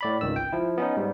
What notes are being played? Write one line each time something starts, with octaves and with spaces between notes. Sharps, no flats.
A2 D5 B5
G#1 C#2 D#3 E6
G5
F3 E4
B3 C#4 D#4
G#2 G3